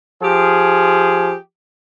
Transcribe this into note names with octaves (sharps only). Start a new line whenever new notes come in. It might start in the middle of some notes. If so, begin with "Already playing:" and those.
F3 G4 G#4